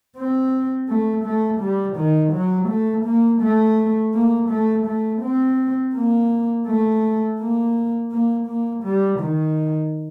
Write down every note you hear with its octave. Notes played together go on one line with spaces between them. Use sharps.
C4
A3
A3
G3
D#3
F#3
A3
A#3
A3
A#3
A3
A3
C4
A#3
A3
A#3
A#3
A#3
G3
D#3